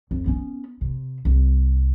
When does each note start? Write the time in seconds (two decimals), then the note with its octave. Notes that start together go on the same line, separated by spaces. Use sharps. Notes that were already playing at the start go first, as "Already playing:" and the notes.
0.11 F2
0.26 B3 C#4
0.81 C3
1.25 C2